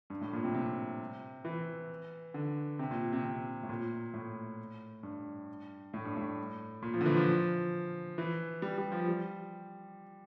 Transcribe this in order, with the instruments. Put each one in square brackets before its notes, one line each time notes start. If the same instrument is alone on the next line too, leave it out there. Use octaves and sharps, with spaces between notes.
[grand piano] G2
A2
A#2
C3
C3
E3
D3
C3
A#2
C3
C3
A2
A#2
A2
G2
A2
G2
A2
A#2
F3
D3
E3
F3
E3
G3
G3
F3
G3